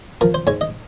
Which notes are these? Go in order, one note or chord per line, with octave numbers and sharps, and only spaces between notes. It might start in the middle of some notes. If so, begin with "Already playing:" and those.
F3 A#4
C5
G#2 C#5
D#5